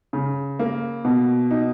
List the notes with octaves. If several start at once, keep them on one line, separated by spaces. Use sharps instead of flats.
C#3
A#3
B2
D#4